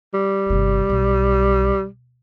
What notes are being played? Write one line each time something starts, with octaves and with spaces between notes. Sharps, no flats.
G3
G1 C3
B1